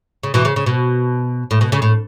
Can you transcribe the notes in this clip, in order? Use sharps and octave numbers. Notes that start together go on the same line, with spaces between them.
C#3
B2 E3
C#3
C#3
B2
A2
B2
C#3
A2